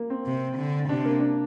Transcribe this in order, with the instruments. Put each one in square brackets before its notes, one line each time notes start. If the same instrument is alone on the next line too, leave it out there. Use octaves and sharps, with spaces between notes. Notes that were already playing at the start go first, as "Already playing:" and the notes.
Already playing: [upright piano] A#3
C4
[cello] C3
D3
[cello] C3 [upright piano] D4
[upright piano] A#3
D4